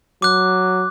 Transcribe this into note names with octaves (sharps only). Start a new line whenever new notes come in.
F#3 D6 F#6